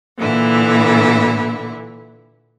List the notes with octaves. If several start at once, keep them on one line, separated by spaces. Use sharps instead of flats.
A#2 D3 E3 E4